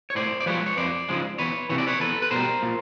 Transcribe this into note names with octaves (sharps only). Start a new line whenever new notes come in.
C#5
A2 C5 D5
D5
F3 G#3 B4 C#5
C#5
F2 C5 D5
C#3 F3 G#3
E2 B4 C#5
C3 E3 C#5
D5
B4 C#5
E2 A4 B4
B4
B2 G3 A#4 C5
A#2